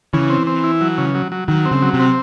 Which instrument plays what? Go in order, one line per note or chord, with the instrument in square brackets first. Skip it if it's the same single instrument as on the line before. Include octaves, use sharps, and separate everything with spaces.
[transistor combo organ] C#3 [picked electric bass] E3
[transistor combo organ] C4
C4
E4
F#3
C#3
F#3
F#3
[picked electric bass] D#3 [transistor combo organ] F#3
[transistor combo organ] C4
[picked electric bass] C#3
[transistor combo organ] F#3
[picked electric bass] C3
[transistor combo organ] C4